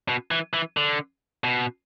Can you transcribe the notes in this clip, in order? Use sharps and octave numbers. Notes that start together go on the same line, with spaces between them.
B2
E3
E3
D3
B2